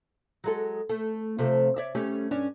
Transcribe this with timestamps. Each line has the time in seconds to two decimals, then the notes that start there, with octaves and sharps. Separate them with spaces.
0.44 F#3 G#3 A4
0.89 A3
1.38 C3 F3 A3
1.76 C#5 D5 E5
1.95 G3 A3 C#4
2.31 G2 C#4 D4